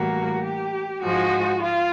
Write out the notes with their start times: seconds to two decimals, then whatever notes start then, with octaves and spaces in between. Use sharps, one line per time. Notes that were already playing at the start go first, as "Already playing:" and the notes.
Already playing: A2 E3 G3 A#3 F#4
0.44 G4
1.03 G#2 F3 G#3 F#4
1.62 F4